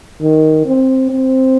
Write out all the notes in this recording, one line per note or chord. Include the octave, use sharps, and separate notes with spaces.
D#3
C4
C4